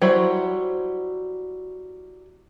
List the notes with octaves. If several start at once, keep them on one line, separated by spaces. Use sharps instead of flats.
F#3 G3 E4 C5 B5